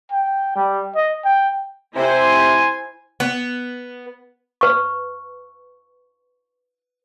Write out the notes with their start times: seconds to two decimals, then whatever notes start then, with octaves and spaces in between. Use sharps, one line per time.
0.12 G5
0.56 G3
0.95 D#5
1.24 G5
1.96 C3 E4 C5 G#5
3.20 B3
4.61 B4 C#6